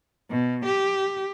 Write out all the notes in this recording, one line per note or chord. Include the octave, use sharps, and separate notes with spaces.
B2
G4